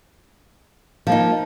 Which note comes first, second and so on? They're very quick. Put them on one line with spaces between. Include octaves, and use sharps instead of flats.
F3 A#3 D#4